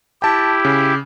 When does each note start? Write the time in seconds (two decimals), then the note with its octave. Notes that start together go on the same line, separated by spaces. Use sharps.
0.22 E4 G4 G5 A5
0.65 C#3